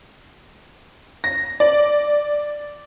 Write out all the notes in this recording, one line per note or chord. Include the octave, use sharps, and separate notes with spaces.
A#6
D5